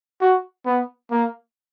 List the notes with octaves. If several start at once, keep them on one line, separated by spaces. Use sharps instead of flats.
F#4
B3
A#3